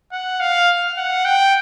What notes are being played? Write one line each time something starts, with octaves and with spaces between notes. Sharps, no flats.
F#5
F5
F#5
G5